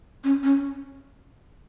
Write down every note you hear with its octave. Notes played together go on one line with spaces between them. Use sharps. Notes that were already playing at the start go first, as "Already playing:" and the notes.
C#4
C#4